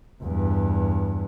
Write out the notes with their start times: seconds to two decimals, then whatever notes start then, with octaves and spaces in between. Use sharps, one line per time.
0.23 E2 G2